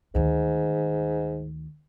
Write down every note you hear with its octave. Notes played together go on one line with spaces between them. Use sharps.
D2 G#2 D#3